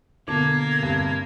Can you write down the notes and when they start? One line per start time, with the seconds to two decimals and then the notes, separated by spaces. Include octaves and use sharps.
0.28 B2 D3 A#3 A5 D6 G#6
0.79 G2 C3